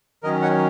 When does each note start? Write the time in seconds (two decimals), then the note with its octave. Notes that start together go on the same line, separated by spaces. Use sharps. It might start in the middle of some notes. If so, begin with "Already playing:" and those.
0.23 D#3 F#3 C#4 A#4 D#5
0.42 C#5 F#5